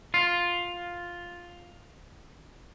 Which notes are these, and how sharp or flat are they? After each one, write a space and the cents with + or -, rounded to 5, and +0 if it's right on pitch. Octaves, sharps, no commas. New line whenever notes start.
F4 +5